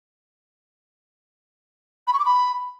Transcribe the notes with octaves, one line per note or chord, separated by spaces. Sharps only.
B5
C#6
D6
B5